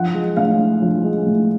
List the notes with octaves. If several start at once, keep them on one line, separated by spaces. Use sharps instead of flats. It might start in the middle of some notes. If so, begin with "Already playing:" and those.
Already playing: F3 F#5
G#3
A2 F5
A2
F3
G#3
A2